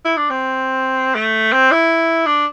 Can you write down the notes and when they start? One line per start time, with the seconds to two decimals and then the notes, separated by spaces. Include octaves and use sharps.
0.05 E4
0.17 D4
0.30 C4
1.15 A3
1.52 C4
1.71 E4
2.26 D4